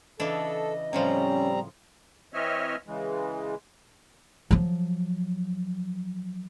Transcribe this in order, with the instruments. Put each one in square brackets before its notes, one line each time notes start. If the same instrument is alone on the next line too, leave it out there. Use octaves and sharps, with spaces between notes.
[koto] C#3 E3 D4 [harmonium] A4 [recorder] D#5
[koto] A2 C#3 F3 [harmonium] G3 C4 A#5 [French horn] C#4
[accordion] E3 C4 C#5 D#5 E5 F6
C#3 E3 G#3
[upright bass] F3 F#3